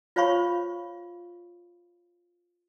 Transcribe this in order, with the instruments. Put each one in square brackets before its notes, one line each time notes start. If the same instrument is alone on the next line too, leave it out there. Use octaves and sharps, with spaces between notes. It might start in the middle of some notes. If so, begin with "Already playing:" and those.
[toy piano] F4 C5 C#5 F5 B5 C#6